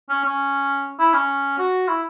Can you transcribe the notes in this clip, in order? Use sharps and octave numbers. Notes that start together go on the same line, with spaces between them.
C#4
C#4
E4
C#4
F#4
E4